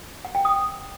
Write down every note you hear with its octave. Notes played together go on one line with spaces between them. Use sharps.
F#5
G5
D#6